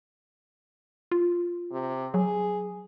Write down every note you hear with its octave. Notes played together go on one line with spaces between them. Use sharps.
F4
C3
F#3 G#4